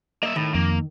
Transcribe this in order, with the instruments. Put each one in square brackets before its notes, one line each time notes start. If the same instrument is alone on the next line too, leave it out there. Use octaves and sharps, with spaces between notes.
[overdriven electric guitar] A#3 E5 [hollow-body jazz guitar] D#5
[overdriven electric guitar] A2 [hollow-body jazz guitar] D#3
[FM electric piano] F2 [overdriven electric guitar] A#3